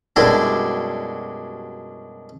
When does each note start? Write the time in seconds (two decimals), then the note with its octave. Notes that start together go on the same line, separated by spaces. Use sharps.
0.16 F#2 B2 G3 G#3 D4 E4